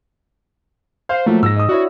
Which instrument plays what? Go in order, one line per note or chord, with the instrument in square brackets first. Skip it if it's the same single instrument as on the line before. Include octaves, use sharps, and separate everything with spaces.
[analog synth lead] C5 [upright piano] F5
[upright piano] F3 F#3 A#3 [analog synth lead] A3
[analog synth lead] G#2 [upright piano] E6 A#6
[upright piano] D#5 D#6
[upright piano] D4 E4 C#5 [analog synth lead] F#4